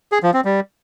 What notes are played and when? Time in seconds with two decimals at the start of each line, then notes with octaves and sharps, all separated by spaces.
0.12 G#4
0.23 F3
0.34 C4
0.45 G3